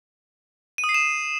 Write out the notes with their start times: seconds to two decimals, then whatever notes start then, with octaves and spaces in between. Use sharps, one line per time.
0.78 D#7
0.84 D#6
0.89 C7
0.94 E7